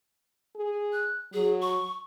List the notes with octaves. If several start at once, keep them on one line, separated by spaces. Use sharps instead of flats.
G#4
F#6
F#3 G#4
C#6